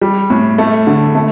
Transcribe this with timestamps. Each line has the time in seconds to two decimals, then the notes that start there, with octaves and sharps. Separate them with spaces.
0.01 G3
0.30 A2
0.58 A3
0.87 D3
1.15 A3